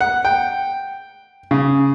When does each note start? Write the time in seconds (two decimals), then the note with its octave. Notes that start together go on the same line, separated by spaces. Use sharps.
0.01 F#5
0.25 G5
1.51 C#3